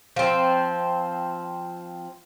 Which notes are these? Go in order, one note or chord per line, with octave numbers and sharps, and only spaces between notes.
F3 C4